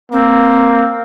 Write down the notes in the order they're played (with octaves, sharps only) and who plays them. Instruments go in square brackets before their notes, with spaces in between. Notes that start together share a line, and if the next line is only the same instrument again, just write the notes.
[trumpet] A#3 [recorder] C4